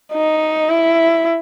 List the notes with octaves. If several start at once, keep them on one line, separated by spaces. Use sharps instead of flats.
D#4
E4